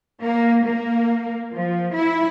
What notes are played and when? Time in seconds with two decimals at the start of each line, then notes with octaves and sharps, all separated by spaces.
0.22 A#3
0.64 A#3
1.53 F3
1.94 E4